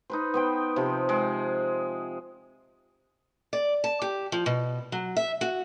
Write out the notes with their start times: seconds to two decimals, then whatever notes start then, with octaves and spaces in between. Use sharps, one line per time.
0.10 D#4 B4 C5
0.34 B3 C5 G5
0.76 C3 F3
1.09 G#3
3.53 D5
3.84 A5
4.02 G4
4.32 F3
4.46 B2
4.92 F#3
5.16 E5
5.41 F#4